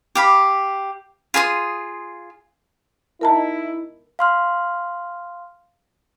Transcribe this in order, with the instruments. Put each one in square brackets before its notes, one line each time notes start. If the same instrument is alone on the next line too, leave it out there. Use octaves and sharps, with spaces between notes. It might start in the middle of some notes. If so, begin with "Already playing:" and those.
[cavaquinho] G4 F5 B5
F4 G#4 C6 D#6
[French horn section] D#4 E4 [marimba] A#4 A5 A#5
[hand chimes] F5 C6 F6